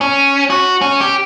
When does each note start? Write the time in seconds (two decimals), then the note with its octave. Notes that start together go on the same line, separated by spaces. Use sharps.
0.01 C#4
0.50 F#4
0.81 C#4
1.01 G4